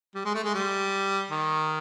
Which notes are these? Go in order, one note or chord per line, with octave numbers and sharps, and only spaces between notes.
G3
G#3
A3
G#3
G3
D#3